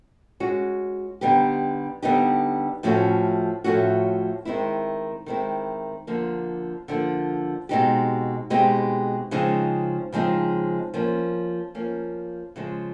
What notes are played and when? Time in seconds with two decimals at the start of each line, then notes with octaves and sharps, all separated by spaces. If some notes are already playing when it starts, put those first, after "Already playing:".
0.40 G#3 C#4 F#4
1.21 D3 G3 B3 D#4 G4
2.02 D3 G3 B3 D#4 G4
2.83 A2 F3 A3 C#4 F#4
3.64 A2 F3 A3 C#4 F#4
4.45 D#3 G#3 C4 E4
5.26 D#3 G#3 C4 E4
6.07 D3 F3 A#3
6.88 D3 F3 A#3
7.69 B2 G#3 C4 D#4 G4
8.50 B2 G#3 C4 D#4 G4
9.31 C#3 F3 G#3 C4 D#4
10.12 C#3 F3 G#3 C4 D#4
10.94 F3 A#3 C#4
11.75 F3 A#3 C#4
12.56 C#3 F3 G#3